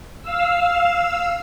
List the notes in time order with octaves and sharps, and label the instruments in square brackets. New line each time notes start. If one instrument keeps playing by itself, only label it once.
[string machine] F5 E6